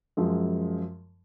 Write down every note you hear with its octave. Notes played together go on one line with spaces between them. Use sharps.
F#2 F3 G#3